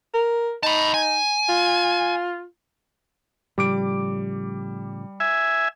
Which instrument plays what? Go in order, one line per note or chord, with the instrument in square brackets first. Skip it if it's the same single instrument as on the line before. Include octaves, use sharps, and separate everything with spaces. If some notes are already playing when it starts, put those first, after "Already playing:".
[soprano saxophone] A#4
[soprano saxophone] D#4 [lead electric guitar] A5 B5
[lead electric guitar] G#5
[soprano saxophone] F4
[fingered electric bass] A2 C#3 F3 [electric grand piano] G3 D6 D7
[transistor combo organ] E5 G#5